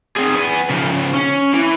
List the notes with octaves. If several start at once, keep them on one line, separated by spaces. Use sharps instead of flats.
C4 G#4
B3 G#5
C#3 F3
C#4
E3